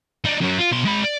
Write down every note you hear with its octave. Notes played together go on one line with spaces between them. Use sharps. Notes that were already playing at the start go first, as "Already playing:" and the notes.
D4 D#4
F#2 F#3
F4
B2 C6
G#3 B5
D5